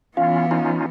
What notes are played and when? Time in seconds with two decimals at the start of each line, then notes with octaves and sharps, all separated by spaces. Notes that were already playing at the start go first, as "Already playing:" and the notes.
0.17 E3 B3 C#4 F4 F5
0.51 C#4 D#4 F4